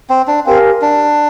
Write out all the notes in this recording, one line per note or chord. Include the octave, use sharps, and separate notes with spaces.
C4
D4
C4 G4 A#4 F5 G#5
D4